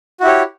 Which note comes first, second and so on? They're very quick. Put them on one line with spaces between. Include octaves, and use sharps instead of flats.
F#4 E4 G4 C#5